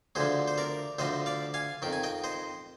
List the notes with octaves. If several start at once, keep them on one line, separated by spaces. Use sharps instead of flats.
D2 D3 F3 G#4 C5
C5
A#4 D5
D2 D3 F3 C5 D#5
D5 F5
F5 G#5
F2 D#3 G5
G#5
D#5 G5
C5 D#5